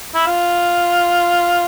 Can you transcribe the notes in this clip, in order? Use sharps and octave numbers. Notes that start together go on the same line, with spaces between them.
E4
F4